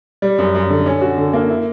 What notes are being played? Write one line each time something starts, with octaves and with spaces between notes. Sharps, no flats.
G3
F#2
F#2
D3
C#4
F#4
D3
A#3
E4